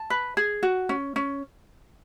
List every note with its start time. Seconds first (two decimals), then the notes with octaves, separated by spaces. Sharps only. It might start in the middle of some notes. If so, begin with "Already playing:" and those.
Already playing: A5
0.10 B4
0.37 G#4
0.63 F#4
0.89 C#4
1.16 C#4